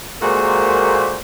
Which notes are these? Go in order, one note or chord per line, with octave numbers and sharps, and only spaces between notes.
A#2 G#3 A#3 F#4 A4 C5